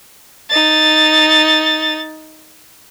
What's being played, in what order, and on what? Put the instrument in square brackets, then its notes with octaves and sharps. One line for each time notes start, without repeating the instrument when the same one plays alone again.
[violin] D#4 A6